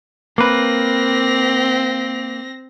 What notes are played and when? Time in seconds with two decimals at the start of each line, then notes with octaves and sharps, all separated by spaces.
0.38 A#3 C4 B4 A#6